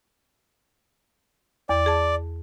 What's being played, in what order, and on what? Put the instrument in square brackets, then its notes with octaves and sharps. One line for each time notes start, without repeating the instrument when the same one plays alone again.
[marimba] E2 [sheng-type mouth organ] D5
[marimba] G#4 A5